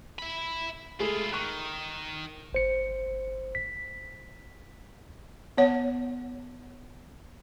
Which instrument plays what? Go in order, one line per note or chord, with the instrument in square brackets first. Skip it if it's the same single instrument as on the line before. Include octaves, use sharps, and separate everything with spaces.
[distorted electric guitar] E5 B5
[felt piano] G#3 A3 G#4 [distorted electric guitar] E4 F4
[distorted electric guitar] D#3 [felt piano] C#6 F#6
[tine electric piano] G1 C5 C#7
B6
[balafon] B3 C#5 F#5